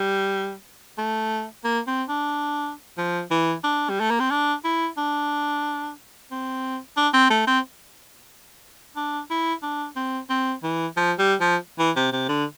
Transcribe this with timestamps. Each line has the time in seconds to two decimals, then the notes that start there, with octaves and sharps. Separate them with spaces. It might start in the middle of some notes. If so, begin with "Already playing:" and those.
Already playing: G3
0.98 A3
1.64 A#3
1.87 C4
2.09 D4
2.98 F3
3.31 E3
3.64 D4
3.90 G3
4.00 A3
4.10 A#3
4.20 C4
4.30 D4
4.64 E4
4.97 D4
6.31 C4
6.97 D4
7.14 C4
7.30 A3
7.47 C4
8.96 D4
9.30 E4
9.62 D4
9.96 C4
10.30 C4
10.63 E3
10.97 F3
11.19 G3
11.41 F3
11.79 E3
11.96 C3
12.12 C3
12.29 D3